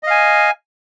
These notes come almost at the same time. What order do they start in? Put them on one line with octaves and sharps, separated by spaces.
D#5 F5 G#5